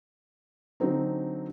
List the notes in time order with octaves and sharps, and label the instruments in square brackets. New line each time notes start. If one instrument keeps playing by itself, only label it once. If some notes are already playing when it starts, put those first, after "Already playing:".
[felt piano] D3 F#3 C4 D#4